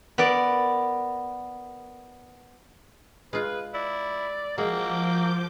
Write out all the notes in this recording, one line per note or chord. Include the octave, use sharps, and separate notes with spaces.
B3 A#4 D5
G#3 F4 B4
E4 D5
F3 G#3 A#3 F#4 G5 D6 G6